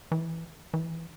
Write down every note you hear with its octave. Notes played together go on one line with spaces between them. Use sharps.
E3
E3